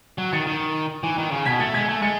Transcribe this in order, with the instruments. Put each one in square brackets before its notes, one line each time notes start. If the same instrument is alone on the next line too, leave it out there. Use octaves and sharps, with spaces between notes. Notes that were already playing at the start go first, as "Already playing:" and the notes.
[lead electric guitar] F#3
[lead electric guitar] D#3 [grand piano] A6 C#7
[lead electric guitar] D#3
E3
D#3
C#3
[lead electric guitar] B2 [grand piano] G#6 B6
[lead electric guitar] A3 [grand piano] A6 C#7
[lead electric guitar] G#3 [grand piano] G#6 B6
[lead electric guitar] A3
[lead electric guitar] G#3 [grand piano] A6 C#7